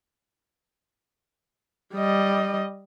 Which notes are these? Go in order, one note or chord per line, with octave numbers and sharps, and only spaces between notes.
G3 D#5